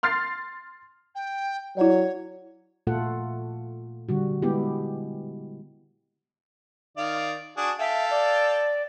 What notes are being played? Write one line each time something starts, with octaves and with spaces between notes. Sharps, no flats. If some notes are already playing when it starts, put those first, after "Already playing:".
C6 F6 A6 C7
G5
F#3 E4 C#5 D5
A#2 A3 F4 A4 F#5
D3 G3 F#4
G#3 B3 E4 G4
D#3 D5 F5
D4 F#4 G#4
A4 E5 F5 G5
D5